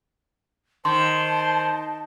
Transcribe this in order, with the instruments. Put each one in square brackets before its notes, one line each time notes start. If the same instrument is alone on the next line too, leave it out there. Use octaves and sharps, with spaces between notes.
[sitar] D#3 [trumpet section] C5 [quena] A5 [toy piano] C6